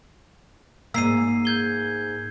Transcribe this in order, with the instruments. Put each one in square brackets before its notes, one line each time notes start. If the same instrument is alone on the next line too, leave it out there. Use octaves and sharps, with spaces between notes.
[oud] G#2 A#3 [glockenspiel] E6 C7 D#7
[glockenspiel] G6 G#6 G7